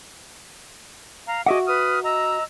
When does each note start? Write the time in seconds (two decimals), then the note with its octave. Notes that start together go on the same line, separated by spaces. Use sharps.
1.27 F5 A#5
1.46 F#4 G#4 D#5 E5 F#5 D6
1.66 B4 D#6 F6
2.03 D#5 A#5 E6